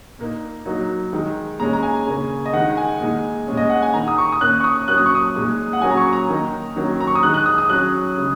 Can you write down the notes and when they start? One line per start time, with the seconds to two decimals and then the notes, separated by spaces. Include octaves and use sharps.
0.19 A#2 A#3 D#4
0.65 F#3 A#3 D#4
1.13 D#3 G#3 D#4
1.59 A#2 G#3 C#4 A#5
1.73 A#5
1.83 G#5
2.07 C#3 A#3 C#4
2.46 D#5
2.53 D#3 G#3 D#4 F#5
2.77 G#5
3.00 A#2 G#3 D#4
3.47 A#2 G#3 C#4
3.57 D#5
3.70 F#5
3.82 G#5
3.94 D#3 A#3 D#4 A#5
4.08 D#6
4.18 C#6
4.32 D#6
4.41 A#2 A#3 C#4 F#6
4.60 C#6
4.64 D#6
4.87 F#3 A#3 C#4 F#6
4.98 D#6
5.06 C#6
5.15 D#6
5.35 A#2 G#3 D#4
5.73 F#5
5.81 F#3 A#3 C#4 G#5
5.90 A#5
5.97 C#6
6.13 A#5
6.28 D#3 A#3 D#4
6.76 D#3 F#3 A#3 C#4
7.00 A#5
7.07 C#6
7.15 D#6
7.23 D#3 G#3 D#4 F#6
7.34 F#6
7.46 D#6
7.58 D#6
7.69 F#3 C#4 F#6
8.17 C#3 G#3